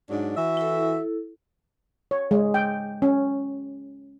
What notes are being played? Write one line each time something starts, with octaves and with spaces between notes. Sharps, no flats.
G#2 F#3 D4
E3 F#4 E5
E4 A4
C#5
G#3
G5
C#4